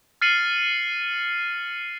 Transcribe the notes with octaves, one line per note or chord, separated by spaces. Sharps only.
F6 A6 C7 C#7 D#7 F#7